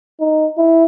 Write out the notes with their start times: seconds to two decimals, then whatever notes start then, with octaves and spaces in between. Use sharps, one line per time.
0.20 D#4
0.58 E4